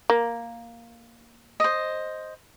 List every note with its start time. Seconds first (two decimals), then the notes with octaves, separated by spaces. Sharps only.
0.10 A#3
1.60 C5 D#5